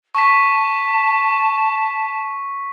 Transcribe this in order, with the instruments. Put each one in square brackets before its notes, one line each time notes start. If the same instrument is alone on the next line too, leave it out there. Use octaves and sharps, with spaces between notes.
[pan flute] A5 [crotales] C#6 B6